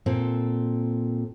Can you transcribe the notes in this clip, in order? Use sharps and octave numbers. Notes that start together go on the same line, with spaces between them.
A#2 C4 A4